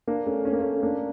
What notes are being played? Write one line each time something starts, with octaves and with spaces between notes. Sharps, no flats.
A#3 D4
A3 C#4
C#4
A#3
A3 C#4
A#3 D4